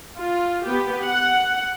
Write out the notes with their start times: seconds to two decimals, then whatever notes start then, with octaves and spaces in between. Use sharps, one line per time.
0.20 F4
0.65 B3 G4
1.05 F#5